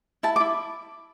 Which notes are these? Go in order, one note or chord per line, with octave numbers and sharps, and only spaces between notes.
E4 A5
D6
E4